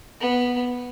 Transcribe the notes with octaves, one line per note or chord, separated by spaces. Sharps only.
B3